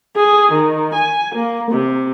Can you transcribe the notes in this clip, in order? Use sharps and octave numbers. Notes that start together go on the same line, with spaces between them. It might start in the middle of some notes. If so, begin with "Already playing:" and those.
G#4
D#3
G#5
A#3
C3